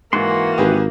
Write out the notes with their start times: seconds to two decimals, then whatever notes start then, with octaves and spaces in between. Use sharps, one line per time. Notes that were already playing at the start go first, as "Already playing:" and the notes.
0.13 G#2 E3 A#3 F#4 C6
0.58 G#1 G4 G#4 B4